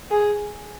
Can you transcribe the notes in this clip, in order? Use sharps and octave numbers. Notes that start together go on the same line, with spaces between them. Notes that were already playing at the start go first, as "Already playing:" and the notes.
G#4